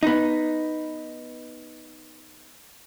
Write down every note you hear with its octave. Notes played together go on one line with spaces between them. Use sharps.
B3 D#4